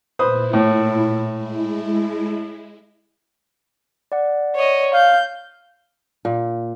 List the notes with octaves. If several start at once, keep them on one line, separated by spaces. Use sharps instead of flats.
A#2 E4 B4 C5 D#6
A2
G#3 E4
D5 F#5
C#5 D#5
F5 G6
A#2